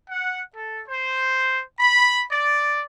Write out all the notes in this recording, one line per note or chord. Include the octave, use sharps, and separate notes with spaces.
F#5
A4
C5
B5
D5